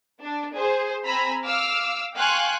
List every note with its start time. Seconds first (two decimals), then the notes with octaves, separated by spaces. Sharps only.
0.22 D4
0.56 G#4 C5
1.05 C4 G#5 A#5 B5 E6
1.46 F5 D6 E6 F6
2.17 F5 G5 G#5 C6 C#6 F#6